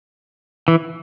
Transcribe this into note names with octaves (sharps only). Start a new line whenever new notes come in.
E3